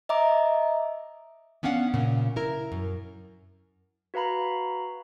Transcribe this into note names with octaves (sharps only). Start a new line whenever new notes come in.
D#5 E5 A#5 D6
B3 C#4 D4 F5 F#5
A#2 C#3
E4 A#4
F#2
F#4 B4 F5 A#5 B5